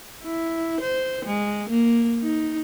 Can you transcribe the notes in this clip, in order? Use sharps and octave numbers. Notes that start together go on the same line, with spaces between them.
E4
C5
G#3
A#3
D#4